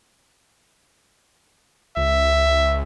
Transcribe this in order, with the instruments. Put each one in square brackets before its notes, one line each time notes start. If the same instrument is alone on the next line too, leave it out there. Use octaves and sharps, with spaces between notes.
[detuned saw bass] C#2 [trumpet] E5